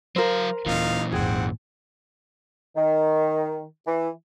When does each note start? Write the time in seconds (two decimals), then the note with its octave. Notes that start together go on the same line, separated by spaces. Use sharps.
0.16 F#3 A#4 C5 F5
0.66 D#1 A#2 E3 C#4 D#4 F4 F5
1.12 G#1 E2 C4 G#4 F#5 G5
2.76 D#3
3.86 E3